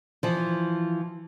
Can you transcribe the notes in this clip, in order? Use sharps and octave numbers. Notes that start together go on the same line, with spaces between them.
E3 F3